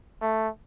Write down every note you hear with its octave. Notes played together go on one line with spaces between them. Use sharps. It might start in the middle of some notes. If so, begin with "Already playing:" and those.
A3